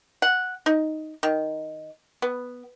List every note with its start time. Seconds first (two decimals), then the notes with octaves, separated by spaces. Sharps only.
0.22 F#5
0.66 D#4
1.23 D#3
2.22 B3